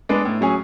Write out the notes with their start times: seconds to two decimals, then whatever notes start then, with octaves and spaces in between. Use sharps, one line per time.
0.09 G#3 B3 D4
0.25 A2
0.41 F#3 C#4 G#4